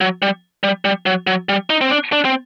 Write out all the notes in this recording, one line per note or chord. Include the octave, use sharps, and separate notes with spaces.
F#3
G3
G3
G3
F#3
F#3
G3
D#4
C4
D4
D4
C4